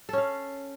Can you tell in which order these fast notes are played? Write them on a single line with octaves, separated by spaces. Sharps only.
A4 C#4 F5